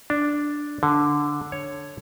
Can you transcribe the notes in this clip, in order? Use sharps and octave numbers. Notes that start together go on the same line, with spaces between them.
D4
D3
C#5